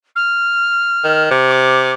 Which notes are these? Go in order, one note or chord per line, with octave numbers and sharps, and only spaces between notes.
F6
D#3
C3
D6